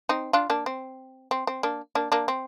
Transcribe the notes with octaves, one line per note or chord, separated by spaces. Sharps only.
C4 D#4
D4 F4
A#3 D4
C4
C4
C4
A#3 D4
A#3 D4
A#3 D4
C4